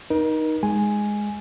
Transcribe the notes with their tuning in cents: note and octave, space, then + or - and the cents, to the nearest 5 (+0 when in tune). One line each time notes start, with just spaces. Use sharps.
D#4 +0 A#4 +35
G#3 +0 G#5 +0